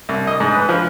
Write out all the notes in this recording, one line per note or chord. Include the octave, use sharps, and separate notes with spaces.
C2
D#5
G#2
B4
F3